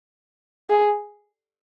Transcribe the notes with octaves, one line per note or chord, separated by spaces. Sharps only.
G#4